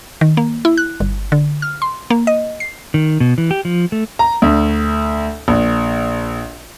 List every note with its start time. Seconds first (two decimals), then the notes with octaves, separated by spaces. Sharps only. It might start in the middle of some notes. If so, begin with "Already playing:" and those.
0.21 D#3
0.37 A#3
0.65 E4
0.77 F#6
1.00 G1
1.32 D3
1.62 F6
1.82 C6
2.10 A#3
2.27 D#5
2.60 C7
2.94 D#3
3.20 B2
3.38 E3
3.51 G4
3.65 F3
3.92 A3
4.19 A#5
4.42 D2
5.48 A#1